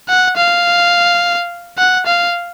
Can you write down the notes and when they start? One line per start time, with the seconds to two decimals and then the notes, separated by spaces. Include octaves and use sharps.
0.08 F#5
0.37 F5
1.78 F#5
2.07 F5